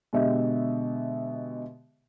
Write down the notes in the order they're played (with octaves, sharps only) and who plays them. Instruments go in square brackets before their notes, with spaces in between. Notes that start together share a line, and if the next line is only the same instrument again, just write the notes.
[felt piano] B2 D3 G#3 G4 D#5 E5